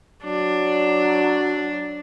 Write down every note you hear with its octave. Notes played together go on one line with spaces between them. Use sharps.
F#3 D4